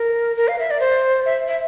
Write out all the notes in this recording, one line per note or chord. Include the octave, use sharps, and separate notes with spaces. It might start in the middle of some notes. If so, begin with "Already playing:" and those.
Already playing: A#4
A#4
F5
E5
D5
C5
E5
E5